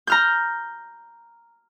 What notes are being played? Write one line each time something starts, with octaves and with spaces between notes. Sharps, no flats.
A#5 F6 G6